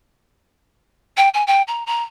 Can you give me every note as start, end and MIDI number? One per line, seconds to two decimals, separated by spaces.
1.17 1.28 79
1.34 1.43 80
1.47 1.62 79
1.67 1.83 82
1.86 2.02 82